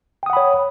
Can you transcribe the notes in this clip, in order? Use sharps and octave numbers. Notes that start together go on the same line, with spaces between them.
C#5 F#5 G5 B5 D#6